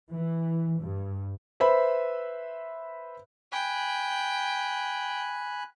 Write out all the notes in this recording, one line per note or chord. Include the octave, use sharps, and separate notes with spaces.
E3
G2
B4 C5 E5 B5
G5 G#5 B5 F#6